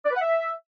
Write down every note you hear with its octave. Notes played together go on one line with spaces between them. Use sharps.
D5
B4
F#5
E5